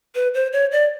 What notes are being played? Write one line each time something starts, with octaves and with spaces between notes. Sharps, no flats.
B4
C5
C#5
D5